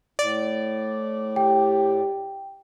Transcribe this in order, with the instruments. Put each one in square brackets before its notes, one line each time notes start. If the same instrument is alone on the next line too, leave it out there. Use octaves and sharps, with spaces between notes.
[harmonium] A2 [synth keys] D5
[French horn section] G4 [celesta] G5